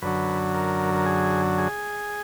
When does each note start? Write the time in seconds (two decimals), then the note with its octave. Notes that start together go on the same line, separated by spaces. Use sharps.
0.02 F#2 D3 F#3 B4
0.54 A#4
0.94 A#4
1.06 G#4
1.58 G#4